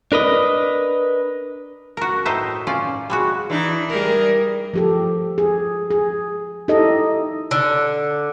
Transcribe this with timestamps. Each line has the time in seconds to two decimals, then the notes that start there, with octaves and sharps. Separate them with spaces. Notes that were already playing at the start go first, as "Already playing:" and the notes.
0.12 D4 A#4 B4 D#5
1.97 F#4 A#4
2.26 A2 D#4 C5 E5
2.67 C#4 F4 D5
3.10 G3 G#3 F#4
3.50 E3 D4 D#4
3.89 G3 G#4 A#4
4.74 F3 G4 A4
5.38 G#4
5.91 G#4
6.68 D#4 E4 G4 A4 D#5
7.51 D3